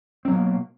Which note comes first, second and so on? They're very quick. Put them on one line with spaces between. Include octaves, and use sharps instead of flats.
C4 F#3 B2 A#3